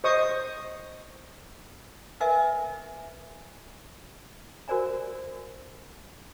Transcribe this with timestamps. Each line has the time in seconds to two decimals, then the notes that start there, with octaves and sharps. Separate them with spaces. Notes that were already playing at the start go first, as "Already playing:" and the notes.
0.04 C5 D#5 C#6 D#6
2.20 A#4 B4 D#5 E5 G#5
4.68 F#4 A#4 C5 D5 G#5 A#5